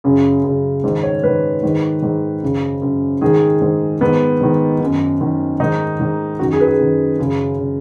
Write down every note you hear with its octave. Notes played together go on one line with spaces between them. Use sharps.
F#2 C#3
F#2 C#3
G#2 D#3
C#5
G#2 D#3 B4
G#2 D#3
G#2 D#3
F#2 C#3
F#2 C#3
G#2 D#3 G#4
G#2 D#3
G#2 D#3 B3
G#2 D#3
F#2 D#3
F#2 D#3
G#2 D#3 D#4
G#2 D#3
F#2 D#3 F#4
G#4
B4
G#4
F#2 D#3
F#2 C#3
C#3